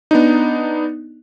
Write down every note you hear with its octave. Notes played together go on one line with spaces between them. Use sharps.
B3 D4 D#4